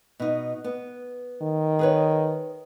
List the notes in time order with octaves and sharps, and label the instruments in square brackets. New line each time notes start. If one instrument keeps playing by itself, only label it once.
[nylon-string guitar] B2 D#4
B3
[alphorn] D#3
[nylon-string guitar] G#4 B4 C#5